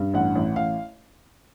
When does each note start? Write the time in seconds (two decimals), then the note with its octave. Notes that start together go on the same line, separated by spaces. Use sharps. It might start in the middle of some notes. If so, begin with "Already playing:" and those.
Already playing: G2
0.14 A1 F#5
0.35 A1
0.56 A1 F5